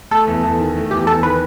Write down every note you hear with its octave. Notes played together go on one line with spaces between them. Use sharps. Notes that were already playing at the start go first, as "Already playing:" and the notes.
A3 A4
E2
E2
D#3
A3
E2 G4
E2 A4
D#3 B4